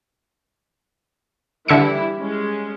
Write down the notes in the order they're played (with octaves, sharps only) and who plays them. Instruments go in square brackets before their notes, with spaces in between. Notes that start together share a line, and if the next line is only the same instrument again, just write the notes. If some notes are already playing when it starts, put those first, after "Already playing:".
[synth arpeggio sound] D3 E5 C#7 [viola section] E3 G3 E4
[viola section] G#3 C#4